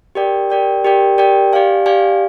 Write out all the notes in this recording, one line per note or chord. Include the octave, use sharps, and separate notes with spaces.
G4 A#4 D5 G5
G4 A#4 D5 G5
G4 A#4 D5 G5
G4 A#4 D5 G5
G4 D5 F5 G#5
G4 D5 F5 G#5